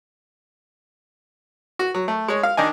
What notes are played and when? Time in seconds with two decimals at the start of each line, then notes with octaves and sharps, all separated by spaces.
1.79 F#4
1.95 F#3
2.08 A3
2.28 G#3 C#5
2.43 F5 F6
2.57 D#3 D4 D#5 G#5